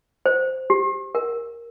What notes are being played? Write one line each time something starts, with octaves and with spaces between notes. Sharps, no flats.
C5
G4
A#4